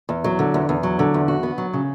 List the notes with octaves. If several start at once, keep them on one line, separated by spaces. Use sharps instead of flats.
E2
F#3
D3
E2
E2
F#3
D3
E2
F#4
B3
F#3
C#3